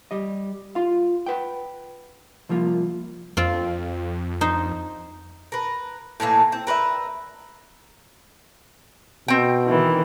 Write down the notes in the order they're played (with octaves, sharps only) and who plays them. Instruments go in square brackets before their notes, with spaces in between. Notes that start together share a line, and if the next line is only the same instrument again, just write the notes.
[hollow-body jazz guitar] G3 D#5
F4 F5
B4 F#5 G5
C2 F3 A#3 F4
[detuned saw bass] F2 [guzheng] C4 F4
[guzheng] D#4 C5
[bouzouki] A#4 B4
A2 D#3 E3 A#3
C4
A#4 B4 C#5 E5
[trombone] B2 [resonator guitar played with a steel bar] C4 G5
[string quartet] D#3 E3